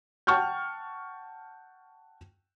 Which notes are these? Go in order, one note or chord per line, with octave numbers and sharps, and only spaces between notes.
F#5 G5 A5 C#6 F6 G6